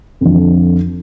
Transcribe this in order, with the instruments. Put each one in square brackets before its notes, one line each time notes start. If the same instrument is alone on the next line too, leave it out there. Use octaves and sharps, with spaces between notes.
[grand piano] F2 D3 F3